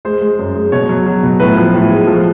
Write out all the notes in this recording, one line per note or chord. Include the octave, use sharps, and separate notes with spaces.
G#3 C5
G#3
F#2
G#3
B2 C#5
F#3
F#3
B2
A2 B4
F3
A2
G#3
F3